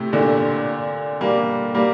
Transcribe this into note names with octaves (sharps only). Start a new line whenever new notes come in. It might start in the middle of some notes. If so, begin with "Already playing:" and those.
Already playing: A2 C3
A#2 D3
G3 A#3
G3 A#3